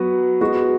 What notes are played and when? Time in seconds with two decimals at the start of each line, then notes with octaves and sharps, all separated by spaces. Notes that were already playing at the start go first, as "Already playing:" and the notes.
Already playing: F#3 B3 F#4 B4
0.41 G#3 B3 F#4